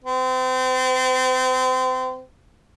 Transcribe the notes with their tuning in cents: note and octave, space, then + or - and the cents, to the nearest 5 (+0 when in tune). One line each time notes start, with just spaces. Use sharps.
C4 -30